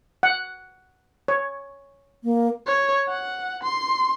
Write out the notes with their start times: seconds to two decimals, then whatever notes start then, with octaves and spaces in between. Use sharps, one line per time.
0.23 F#5
1.28 C#5
2.24 A#3
2.67 C#5
3.09 F#5
3.63 C6